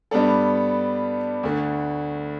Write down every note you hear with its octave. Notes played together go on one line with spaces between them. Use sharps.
G2 G3 B3 D4 A4
D2 D3 A3